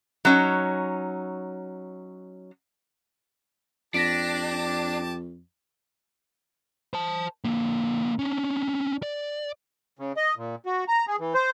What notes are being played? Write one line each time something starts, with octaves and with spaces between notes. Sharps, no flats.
F#3 C#4 D#4
F2 D4 G4 A5 D6 A#6 B6 D7
C5 A5
D3 A#3
C#4 D4
D5
C#3
D#5
A#2
F#4
A#5
G#4
E3
C5